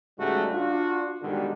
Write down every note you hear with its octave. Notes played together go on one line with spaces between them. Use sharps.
G#2 C#3 F#3 G3 A3 F#4
D4 F4 F#4
G#2 B2 D3 D#3 G3 G#3